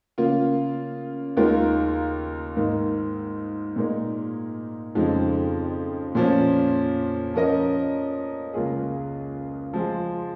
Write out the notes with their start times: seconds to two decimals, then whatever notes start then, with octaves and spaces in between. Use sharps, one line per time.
0.18 C#3 A#3 F4
1.37 D#2 D#3 G#3 F4 A#4
2.57 G#2 D#3 A#3 D#4
3.76 A#2 G#3 D#4 A#4
4.95 F2 C#3 F3 G#3 D#4
6.15 A#2 F3 C#4
7.34 F3 C#4 A#4 D#5
8.54 C#2 C#3 A#3 F4 G#4
9.73 F3 G#3 F4 G#4